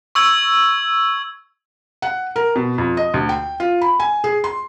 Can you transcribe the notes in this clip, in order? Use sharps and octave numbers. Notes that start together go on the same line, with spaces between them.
C#6 E6 G#6
F#5
A#4
B2
F2
D#5
D2
G5
F4
B5
G#5
G#4
C6